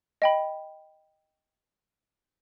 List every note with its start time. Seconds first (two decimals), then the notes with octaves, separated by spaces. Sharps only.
0.22 D#5 G5 B5